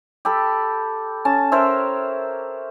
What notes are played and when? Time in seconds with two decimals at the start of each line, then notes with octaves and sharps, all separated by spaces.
0.25 G4 A4 B5
1.25 C#4 A5
1.52 A#4 C5 C#5 E5